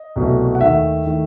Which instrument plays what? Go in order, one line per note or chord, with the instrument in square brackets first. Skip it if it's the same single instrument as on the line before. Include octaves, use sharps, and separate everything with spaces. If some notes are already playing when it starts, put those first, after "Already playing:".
Already playing: [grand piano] D#5
C2 B2 F#3 A3
F#5
D#2 D#3 A3 E5
D#3 A3